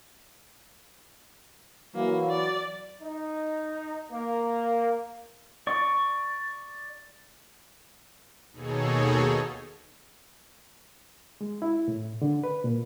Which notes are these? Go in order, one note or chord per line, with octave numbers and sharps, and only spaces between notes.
E3 F#3 A#3
D5
D#4
A#3
D5 C#6
D#2 B2 D#4 G#4 A4 C#5
G#3
E4
A2
D3
B4
A#2